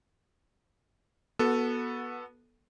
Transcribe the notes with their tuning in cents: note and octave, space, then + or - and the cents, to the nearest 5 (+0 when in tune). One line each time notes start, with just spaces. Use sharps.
B3 -20 F#4 +0 A4 +0